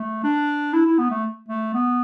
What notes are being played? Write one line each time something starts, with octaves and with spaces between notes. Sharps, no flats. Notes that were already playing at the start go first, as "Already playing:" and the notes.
Already playing: A3
D4
E4
E4
B3
A3
A3
B3